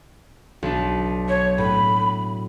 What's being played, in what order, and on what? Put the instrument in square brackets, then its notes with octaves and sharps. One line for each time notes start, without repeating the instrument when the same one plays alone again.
[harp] B1 D4
[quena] C#5
[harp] A2 [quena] B5